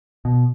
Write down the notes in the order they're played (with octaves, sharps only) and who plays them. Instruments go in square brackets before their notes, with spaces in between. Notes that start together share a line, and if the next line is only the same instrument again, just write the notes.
[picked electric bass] B2